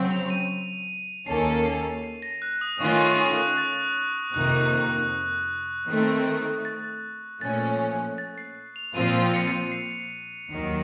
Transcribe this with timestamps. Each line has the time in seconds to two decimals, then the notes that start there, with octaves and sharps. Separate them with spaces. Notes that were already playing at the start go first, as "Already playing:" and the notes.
Already playing: C#3 F#3 C4
0.11 F7
0.30 D#7
1.27 D#2 D#3 A#3 C#4 A4 C7
1.65 C7
2.04 C7
2.22 A#6
2.42 F#6
2.61 D#6
2.80 D#3 A3 C#4 F4 C#6
3.00 C#6
3.18 D#6
3.38 F#6
3.57 A6
4.34 F2 C3 D#3 A#3 D#4 F#6
4.60 F#6
4.85 F#6
5.88 D#3 A3 C4
6.65 A6
7.41 A#2 F3 A3 C#4 A6
8.18 A6
8.38 C7
8.76 F7
8.95 A#2 F3 C4 F4 D#7
9.33 C#7
9.72 C7
10.49 D#2 D#3 F#3